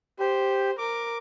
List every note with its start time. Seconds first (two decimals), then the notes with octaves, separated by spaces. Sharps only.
0.19 G4 C5
0.79 A#4 D6